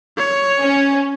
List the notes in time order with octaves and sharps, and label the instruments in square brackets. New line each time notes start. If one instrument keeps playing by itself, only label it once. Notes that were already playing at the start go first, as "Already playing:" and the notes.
[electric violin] C#5
[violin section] C#4